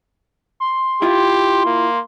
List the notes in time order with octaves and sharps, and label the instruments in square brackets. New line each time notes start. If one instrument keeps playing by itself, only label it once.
[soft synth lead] C6
[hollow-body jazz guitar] E4 F4 [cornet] G4
[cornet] A#3